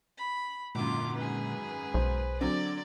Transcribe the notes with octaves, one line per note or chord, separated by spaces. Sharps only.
B5
G#1 F#2 A#2 D3 F4 D6
G#4 B4
B1 C5
D3 F#3 C4 D5